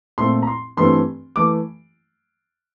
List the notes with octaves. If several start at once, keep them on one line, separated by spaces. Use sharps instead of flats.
A#2 A3 C4 C6
A#5
C6
G2 E3 A3 C4 C6
E3 A3 D6